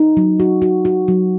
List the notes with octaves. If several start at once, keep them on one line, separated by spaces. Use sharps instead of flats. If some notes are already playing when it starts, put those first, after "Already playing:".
Already playing: D#4
F#3
F#4
F#4
F#4
F#3